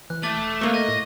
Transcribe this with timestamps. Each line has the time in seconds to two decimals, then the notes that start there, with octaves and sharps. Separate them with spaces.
0.10 E3 F#6
0.23 A3 D6 A6 F#7
0.35 E1
0.61 C2 A3 A#3 C#6
0.74 D#5
0.88 A2